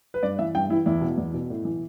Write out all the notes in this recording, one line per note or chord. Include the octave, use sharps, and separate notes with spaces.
B4
G2 D5
E3 E5
G2 G5
E3 E4
E2 E4
B2
E2
B2
A2
E3